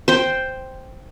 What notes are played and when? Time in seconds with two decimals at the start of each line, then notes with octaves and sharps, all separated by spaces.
0.08 C5 G5